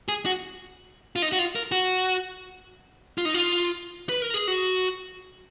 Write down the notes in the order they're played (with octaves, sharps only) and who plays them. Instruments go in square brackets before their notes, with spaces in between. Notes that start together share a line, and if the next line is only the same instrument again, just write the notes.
[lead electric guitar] G#4
F#4
F4
D#4
F#4
F4
A#4
F#4
F4
D#4
F4
B4
A#4
G#4
F#4